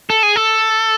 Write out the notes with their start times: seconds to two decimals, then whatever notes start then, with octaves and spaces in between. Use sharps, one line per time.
0.10 A4
0.23 G#4
0.36 A4